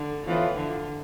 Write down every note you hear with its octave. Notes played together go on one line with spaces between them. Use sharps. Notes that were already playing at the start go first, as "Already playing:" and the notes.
Already playing: D3
A2 E3 F3 B3 F4
D3